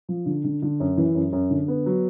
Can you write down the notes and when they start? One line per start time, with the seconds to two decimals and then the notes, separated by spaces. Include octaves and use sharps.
0.09 F3
0.26 D3
0.44 D3
0.62 D3
0.80 F#2
0.97 E3
1.15 F#2
1.32 F#2
1.50 D3
1.68 B3
1.86 F#3